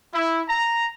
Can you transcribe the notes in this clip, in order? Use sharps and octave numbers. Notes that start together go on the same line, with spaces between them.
E4
A#5